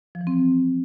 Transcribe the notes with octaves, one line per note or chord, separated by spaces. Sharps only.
F3
E3
C4